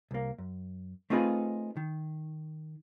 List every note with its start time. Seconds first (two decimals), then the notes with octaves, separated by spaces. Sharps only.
0.11 C2 A#3
0.38 F#2
1.10 A3 C4 D#4 F4 G#4 B4
1.77 D#3